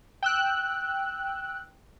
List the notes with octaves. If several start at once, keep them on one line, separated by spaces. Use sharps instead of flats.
G5 E6 F#6